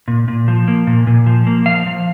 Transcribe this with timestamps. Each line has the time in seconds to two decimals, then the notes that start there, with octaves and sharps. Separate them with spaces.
0.08 A#2
0.28 A#2
0.48 F3
0.68 A#3
0.87 A#2
1.07 A#2
1.26 F3
1.47 A#3
1.66 F3 F5
1.86 F3